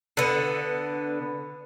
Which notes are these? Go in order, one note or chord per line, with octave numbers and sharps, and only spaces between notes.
D3 B3